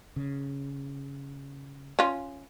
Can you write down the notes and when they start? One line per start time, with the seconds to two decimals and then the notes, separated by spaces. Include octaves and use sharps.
0.16 C#3
1.99 C#4 F4